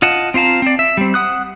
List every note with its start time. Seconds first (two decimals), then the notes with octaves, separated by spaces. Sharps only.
0.02 F4 D#5 F#5 A5
0.34 C4 F4 F5 A5 A#5
0.62 C4 D5
0.79 E5
0.97 G3 C4
1.14 F#5 D#6 F#6